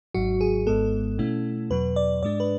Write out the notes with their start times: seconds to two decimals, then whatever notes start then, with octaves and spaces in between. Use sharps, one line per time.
0.14 G#1 G#2 F#3 F#4
0.41 G#4
0.67 G#1 G#2 G#3 B3 A4
1.18 B2 A3 C#4 E4
1.70 E2 B2 F#3 B4
1.96 D5
2.23 G#2 G#3 D4 D5
2.40 B4